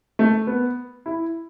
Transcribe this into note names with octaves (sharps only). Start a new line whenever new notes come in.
A3
B3
E4